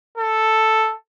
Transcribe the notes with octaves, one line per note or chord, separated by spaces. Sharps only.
A4